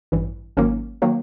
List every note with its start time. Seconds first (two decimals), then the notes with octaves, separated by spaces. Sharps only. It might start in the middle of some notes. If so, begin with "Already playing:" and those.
0.12 A1 G2 E3
0.57 G#1 G#2 D#3 F#3 A#3 C#4
1.02 D#3 F#3 A#3